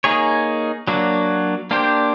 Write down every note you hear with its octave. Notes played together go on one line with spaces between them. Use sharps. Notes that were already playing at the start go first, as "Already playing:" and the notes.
A#3 D#4 G#4 C#5
F#3 A#3 D4 F#4
A#3 D4 G4 C5